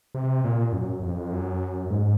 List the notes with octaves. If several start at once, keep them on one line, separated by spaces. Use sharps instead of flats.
C3
A#2
F#2
F2
F#2
G#2